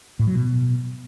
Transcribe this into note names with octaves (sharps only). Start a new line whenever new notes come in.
A2
F#3
B2